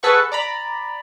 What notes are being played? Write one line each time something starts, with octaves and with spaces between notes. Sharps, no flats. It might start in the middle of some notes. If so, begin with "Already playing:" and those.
G#4 A4 B4 F#5 C#6
D5 A#5 B5